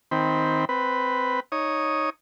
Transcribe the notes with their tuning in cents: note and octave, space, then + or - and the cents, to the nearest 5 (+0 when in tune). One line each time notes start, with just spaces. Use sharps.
D#3 +20 C4 +0 B5 +10
C4 -10 B4 +0
D#4 +0 C#5 +0 D#6 +0